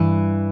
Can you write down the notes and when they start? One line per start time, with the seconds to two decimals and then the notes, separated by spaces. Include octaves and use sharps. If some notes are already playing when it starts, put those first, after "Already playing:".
Already playing: G2 E3